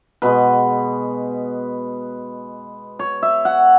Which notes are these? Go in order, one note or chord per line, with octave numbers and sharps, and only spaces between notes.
B2 G#3 B4
C#5
E5
F#5